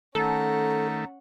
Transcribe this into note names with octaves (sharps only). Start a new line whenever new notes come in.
D#3 A3 C#4 A4 F#5 A#5